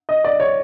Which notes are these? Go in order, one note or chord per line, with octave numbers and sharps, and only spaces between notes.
D#5
D5
C#5